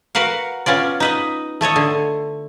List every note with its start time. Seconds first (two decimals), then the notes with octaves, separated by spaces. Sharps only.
0.15 F#4 A#4 B4 F5 F#5
0.66 B3 C#4 F4 D5
1.00 D#4 B4 D#5
1.61 A3 A4 C#5 D#5
1.76 D3